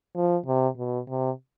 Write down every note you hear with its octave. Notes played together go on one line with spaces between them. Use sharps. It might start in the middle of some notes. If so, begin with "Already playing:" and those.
F3
C3
B2
C3